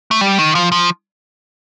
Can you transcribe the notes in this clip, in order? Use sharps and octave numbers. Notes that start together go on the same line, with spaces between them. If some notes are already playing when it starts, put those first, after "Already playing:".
A3
G3
D#3
F3
F3